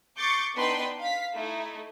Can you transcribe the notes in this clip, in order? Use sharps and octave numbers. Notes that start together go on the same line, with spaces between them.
C#6 D6 G6 A6 C7 C#7
B3 D4 D#4 B4 G5 C6
F5 B6
A3 D#4 E4